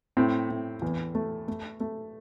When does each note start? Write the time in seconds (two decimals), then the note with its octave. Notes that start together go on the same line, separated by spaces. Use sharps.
0.17 A2 C4
0.50 A2
0.82 E2
1.15 A3
1.48 A3
1.80 A3